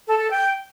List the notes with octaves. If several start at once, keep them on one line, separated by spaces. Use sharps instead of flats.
A4
A4
G5